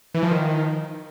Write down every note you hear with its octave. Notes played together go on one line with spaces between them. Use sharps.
E3
F3
D#3